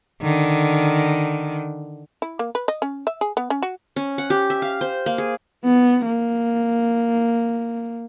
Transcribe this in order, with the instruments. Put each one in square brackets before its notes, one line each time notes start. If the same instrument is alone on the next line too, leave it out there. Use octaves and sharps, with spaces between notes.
[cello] D3 D#3
[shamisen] E4
A#3
B4
D#5
C#4
E5
G#4
B3
C#4
F#4
[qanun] C#4
F#5
G4
E5
F5
C5
A#3
G#4
[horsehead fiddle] B3
A#3